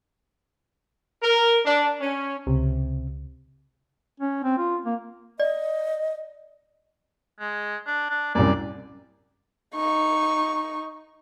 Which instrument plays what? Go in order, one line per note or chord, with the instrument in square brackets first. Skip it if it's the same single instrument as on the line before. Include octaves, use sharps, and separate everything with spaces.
[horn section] A#4
D4
C#4
[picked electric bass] C#2 [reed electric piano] C3
[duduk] C#4
C4
F4
A#3
[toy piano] D5 [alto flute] D#5
[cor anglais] G#3
D4
D4
[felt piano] C2 F#2 [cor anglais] D5
[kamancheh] D#4 C#6